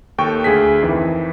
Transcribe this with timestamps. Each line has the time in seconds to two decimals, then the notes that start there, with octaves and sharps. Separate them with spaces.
0.18 D#2 A4 G5 C#6
0.44 D2 G#4 B6
0.82 F2 D#3 E3